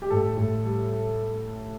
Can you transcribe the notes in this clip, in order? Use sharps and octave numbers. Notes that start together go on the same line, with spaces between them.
G4
A2 A4
A2
G3